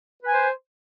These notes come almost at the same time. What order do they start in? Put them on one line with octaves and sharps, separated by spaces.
B4 G#5 C5